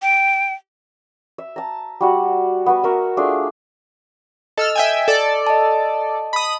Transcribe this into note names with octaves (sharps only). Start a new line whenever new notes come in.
G5
E5
A5 A#5
G3 F#4 F#5
B3 F#4 B4 C#6
F#4 A#4 E5
A3 D4 F4 G#4
A4 D#5 E6 F6
E5 G5 G#5
A4 D5
D#5 A5
B5 D#6